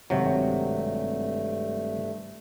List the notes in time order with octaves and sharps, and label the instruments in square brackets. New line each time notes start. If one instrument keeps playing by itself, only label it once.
[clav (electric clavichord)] G#1 C3 F#3 [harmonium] G2 A3